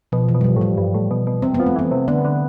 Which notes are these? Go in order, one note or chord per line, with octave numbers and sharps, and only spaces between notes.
B2 F3
E3
B2
G3
F3
A2 G3
G2
A2
B2
B2
C3 C4
B3
F3
A3
E3 B3
C3
D3 B3
D3